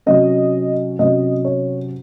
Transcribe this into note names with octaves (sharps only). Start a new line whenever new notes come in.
C3 F#3 C#4 D#5
C3 F#3 C#4 D#5
C#5